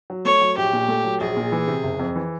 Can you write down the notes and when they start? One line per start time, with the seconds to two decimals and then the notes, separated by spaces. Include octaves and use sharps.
0.10 F#3
0.25 A3 C#5
0.41 F#3
0.57 A#1 G4
0.73 A#2
0.88 A3
1.05 F#3
1.20 A#1 G#4
1.37 A#2
1.52 E3
1.68 C3
1.83 F#1
1.99 F2
2.15 E3